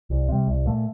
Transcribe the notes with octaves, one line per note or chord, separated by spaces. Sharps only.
C2
C3 G3
C2
A#2 A3